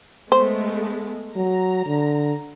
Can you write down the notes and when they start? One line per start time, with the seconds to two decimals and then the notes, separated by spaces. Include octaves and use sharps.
0.32 G#3 A3 B3 C5
1.36 F#3 A#5
1.86 D3